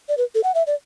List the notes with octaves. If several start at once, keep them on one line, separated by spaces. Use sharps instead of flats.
D5
B4
A4
F#5
E5
D5